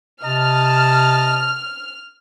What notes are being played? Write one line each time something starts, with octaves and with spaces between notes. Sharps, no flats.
C3 D#5 A5 F6